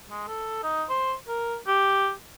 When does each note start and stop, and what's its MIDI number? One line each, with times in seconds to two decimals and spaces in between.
0.10 0.25 56
0.28 0.62 69
0.63 0.84 63
0.89 1.14 72
1.28 1.57 70
1.67 2.11 67